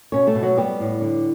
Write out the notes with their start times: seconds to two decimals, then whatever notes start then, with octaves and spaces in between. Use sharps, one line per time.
0.12 B2 C#4 C#5
0.27 A3 A4
0.35 B2
0.42 F#3 F#4
0.57 G3 B3 G4
0.80 A2
1.01 D3